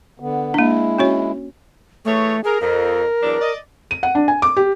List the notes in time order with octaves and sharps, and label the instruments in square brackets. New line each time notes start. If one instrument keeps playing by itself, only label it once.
[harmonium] D3 B3
[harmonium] G#3 E4 [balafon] A#3 D4
[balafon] C#4 F#4 C#5
[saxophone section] E3 G#4 C#5 [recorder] A3
[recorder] G#4 [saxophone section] A#4
[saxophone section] F2 [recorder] A#4
[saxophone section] E2 F#3 D4
D5 D#5
[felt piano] D#7
F#5
D4
G#5
D6
G4